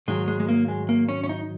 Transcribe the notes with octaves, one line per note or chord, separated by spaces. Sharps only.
G#2 D#3 F#3 G#3
G#3
G#3
A#3
G#3
A#3
C#4
C#4
D#4